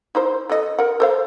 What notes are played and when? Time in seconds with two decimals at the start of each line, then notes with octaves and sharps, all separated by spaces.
0.15 D#4 E4 C5
0.49 E3 A4 D#5
0.78 A#4 F#5
1.00 A4 C5 F5